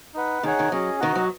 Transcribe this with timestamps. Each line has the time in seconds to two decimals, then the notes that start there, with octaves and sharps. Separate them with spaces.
0.14 D#4 B4 F#5
0.43 D#3 D#4 G#4 C#5 F#5
0.59 D#3
0.72 F#3 C#4 G#4 D#5
1.00 D#3 D#4 F#4 D#5 F#5
1.15 F#3